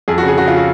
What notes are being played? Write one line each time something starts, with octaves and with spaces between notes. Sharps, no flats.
F2 G#4
F#4
C#3
G#4
C#3 F#4
F4
F#4